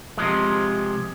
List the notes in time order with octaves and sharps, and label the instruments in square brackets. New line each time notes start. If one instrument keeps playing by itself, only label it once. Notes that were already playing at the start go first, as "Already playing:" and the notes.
[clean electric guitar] C3 F3 G#3